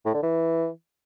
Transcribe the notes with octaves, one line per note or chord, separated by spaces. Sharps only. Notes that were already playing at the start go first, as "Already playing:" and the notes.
A2
D3
E3